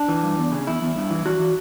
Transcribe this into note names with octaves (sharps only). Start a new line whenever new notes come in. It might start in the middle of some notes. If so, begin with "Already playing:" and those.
Already playing: D4
E3
G2
E2
C#3
E2 E4
E2
G2
E3
E3 F#4
E3